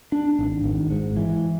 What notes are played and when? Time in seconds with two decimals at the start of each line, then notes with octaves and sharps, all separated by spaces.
0.12 D4
0.39 G#1
0.64 G#1
0.91 G#2
1.17 E3